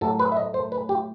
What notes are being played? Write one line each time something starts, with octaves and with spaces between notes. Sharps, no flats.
A2 F#3 A3 A4
B4
E5
D#5
C5
B4
G4